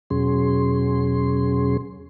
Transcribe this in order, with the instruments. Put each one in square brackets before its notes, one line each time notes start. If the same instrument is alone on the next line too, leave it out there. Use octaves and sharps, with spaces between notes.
[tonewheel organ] E2 B2 F#3 C#4 G#4 C6